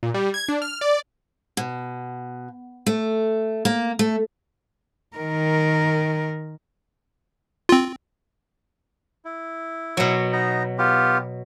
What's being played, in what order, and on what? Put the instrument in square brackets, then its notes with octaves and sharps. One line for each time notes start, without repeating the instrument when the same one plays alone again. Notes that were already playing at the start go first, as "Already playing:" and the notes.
[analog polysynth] A#2
G3
G#6
D4
F6
D5
[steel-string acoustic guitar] B2
A3
A#3
A3
[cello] D#3 A#4
[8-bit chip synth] C4 F4
[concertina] E4
[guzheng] B2 F#3
[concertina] B3 D#4 A#5
B3 F4 G4